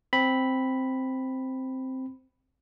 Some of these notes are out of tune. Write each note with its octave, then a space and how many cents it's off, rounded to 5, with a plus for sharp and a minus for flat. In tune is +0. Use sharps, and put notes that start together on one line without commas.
C4 +0 B5 +0